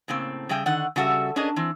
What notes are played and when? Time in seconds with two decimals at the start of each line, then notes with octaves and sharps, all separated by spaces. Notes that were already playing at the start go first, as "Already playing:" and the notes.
0.08 A2 C#3 A#3 C4
0.49 C#3 G3 G#4 E5 G5
0.66 D3 D#3 F#5
0.96 C#3 G3 F#4 A4 E5
1.36 C#4 D4 G#4 A#4 D#5
1.56 E3 C4